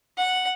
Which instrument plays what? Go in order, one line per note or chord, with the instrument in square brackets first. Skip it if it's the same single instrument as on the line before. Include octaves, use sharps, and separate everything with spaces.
[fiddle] F#5